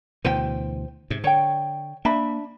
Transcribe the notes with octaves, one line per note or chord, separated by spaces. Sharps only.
D2 B2 E3 C5 G5
G#2 C3
D3 C#5 G5
A#3 D4 E5 B5